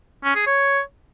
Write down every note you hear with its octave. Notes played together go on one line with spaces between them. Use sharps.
C#4
G#4
C#5